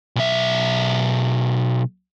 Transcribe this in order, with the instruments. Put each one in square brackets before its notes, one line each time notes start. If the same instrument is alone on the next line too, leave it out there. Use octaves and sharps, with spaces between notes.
[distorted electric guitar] B1 E5